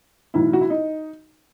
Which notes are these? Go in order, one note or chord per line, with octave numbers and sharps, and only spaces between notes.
B1 A2 E3 E4
F#4
E4
D#4